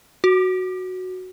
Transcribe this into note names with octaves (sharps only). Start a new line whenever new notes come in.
F#4